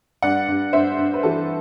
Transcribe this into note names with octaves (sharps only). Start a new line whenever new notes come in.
G2 D5 F#5
G2
G2 C5 E5
G2
B4
E3 F#4 A4